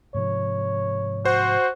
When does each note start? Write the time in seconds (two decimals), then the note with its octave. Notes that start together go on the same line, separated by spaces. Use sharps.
0.15 G#2 C3 F3 C#5
1.25 F#4 C5